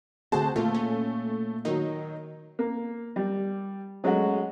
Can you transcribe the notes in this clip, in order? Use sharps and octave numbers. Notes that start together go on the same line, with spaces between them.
D3 A3 C4 F#4 G#4 C5 A5
A#2 A3 A#3 F4
C#4
D#3 F#3 D#4
A#3
G3
F#3 G#3 A3 C#4 F#4